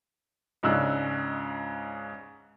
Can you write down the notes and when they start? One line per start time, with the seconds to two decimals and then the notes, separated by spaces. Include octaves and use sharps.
0.63 C#2 G#2 C#3 D4 E6 F#6